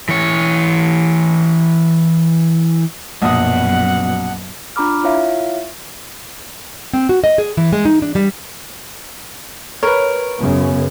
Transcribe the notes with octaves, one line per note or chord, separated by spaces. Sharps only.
E3 C#5
A#1 F#2 B2 F#5 D#6
D4 F4 A#5 B5 D6 F6
E4 F4 C#5 E5 F5
C4
F#4
D#5
G#4
E3
G#3
D#4
D4
G3
A#4 B4 C#5
F#2 C#3 B3